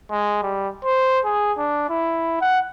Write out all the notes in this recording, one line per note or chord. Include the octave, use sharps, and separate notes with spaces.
G#3
G3
C5
G#4
D4
E4
F#5